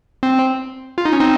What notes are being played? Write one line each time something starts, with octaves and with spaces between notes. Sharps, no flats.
C4
F4
D#4
C#4
C4 D#4